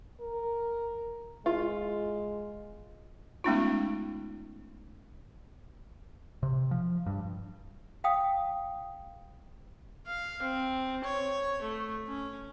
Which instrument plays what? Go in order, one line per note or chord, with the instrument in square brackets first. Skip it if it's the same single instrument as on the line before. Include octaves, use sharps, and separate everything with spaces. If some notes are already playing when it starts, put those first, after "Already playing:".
[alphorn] A#4
[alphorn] G#3 [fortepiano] F4
[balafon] G#3 A3 B3 C#4 D#4 F4
[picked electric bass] C3
F3
G2
[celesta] F5 G5 D#6
[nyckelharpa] F5
C4
C#5
A3
C#4